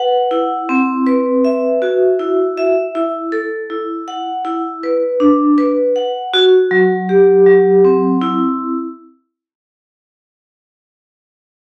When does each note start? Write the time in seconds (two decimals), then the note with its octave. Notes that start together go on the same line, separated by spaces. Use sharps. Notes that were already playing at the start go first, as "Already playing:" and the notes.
Already playing: B4 F#5
0.31 E4
0.69 C4
1.07 B4
1.45 E5
1.82 F#4
2.20 E4
2.58 E5
2.95 E4
3.32 A4
3.70 E4
4.08 F#5
4.45 E4
4.83 B4
5.20 D4
5.58 B4
5.96 F#5
6.34 F#4
6.71 F#3
7.09 G4
7.46 F#3
7.85 C4
8.22 E4